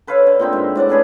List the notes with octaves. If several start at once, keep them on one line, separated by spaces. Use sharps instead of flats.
A4 B4 C#5 F5
D3
A#2 C4 D#4 G5
G#2 E5
A2 D5 F#5 A5
C#4 D4 G#4 B4